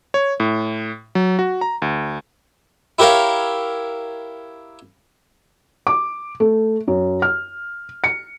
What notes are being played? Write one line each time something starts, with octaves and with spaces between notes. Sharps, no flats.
C#5
A2
F#3
F#4
A#5
D2
E4 G4 A#4 C#5 F5
D6
A3
F#2
F6
C#7